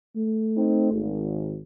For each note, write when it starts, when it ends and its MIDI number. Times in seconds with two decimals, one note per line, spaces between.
0.16 1.13 57
0.57 0.91 60
0.57 0.91 63
0.92 1.60 32